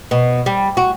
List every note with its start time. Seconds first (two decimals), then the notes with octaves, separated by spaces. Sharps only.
0.11 B2
0.46 G3
0.77 F#4